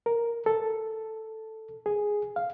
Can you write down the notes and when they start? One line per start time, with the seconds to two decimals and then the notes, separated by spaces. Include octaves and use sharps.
0.06 A#4
0.46 A4
1.86 G#4
2.36 F5